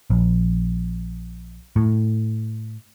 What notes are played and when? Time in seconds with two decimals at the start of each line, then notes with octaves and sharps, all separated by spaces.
0.10 A#1
1.76 A2